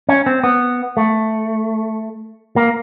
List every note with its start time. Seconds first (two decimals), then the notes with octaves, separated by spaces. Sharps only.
0.09 C#4
0.26 C4
0.44 B3
0.97 A3
2.56 A#3